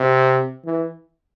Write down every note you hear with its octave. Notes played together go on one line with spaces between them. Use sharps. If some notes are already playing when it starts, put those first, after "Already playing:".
Already playing: C3
E3